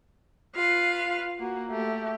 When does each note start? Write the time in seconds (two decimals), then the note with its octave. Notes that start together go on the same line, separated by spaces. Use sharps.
0.56 F4 B4 F5
1.40 A#3 F#4
1.72 A3 G4